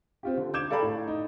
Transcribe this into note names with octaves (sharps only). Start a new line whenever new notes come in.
C4 F4 G4
D3
D6 G6 G#6 E7
A4 D5 F5 G5 A#5 B5
A2
D#4